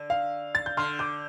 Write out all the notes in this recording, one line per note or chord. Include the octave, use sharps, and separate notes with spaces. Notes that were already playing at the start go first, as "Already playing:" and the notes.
Already playing: D3
F5
A6
G6
D3 C6 F6
D6 G6